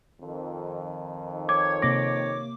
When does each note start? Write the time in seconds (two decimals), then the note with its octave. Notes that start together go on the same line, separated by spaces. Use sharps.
0.21 F2 D#3
1.49 C#5 D6 G#6
1.82 C3 A#3 D6 A#6